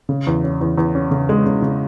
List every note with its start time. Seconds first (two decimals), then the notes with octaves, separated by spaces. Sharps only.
0.09 C#3
0.27 E2
0.44 C#4
0.61 E2
0.78 E2
0.95 C#4
1.11 C#3
1.29 G#3
1.46 C#3
1.62 C#3